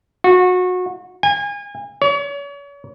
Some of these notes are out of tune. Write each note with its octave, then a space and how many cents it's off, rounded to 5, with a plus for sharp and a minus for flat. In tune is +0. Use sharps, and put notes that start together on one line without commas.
F#4 -25
G#5 -30
C#5 +40